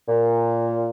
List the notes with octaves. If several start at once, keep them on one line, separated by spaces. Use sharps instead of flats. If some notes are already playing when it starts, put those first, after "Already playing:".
A#2